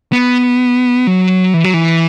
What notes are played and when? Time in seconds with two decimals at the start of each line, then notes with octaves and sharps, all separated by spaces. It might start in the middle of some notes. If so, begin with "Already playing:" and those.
0.12 B3
1.07 F#3
1.54 E3
1.64 F#3
1.74 E3